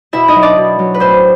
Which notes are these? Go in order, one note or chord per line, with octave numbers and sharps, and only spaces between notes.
B2 E4 E5
D#4 D#5
F#3
D4 D5
B2
F#3
B4
A2 C4 C5